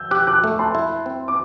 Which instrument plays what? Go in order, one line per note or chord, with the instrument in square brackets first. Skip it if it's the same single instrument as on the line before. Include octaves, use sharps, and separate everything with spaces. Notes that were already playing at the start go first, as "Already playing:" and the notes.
Already playing: [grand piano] E6 G6
[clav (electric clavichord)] G4 [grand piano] D6 F#6
[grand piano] D6 F#6
[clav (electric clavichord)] A3
[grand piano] A5 C6
[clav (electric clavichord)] E4
C4
[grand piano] D6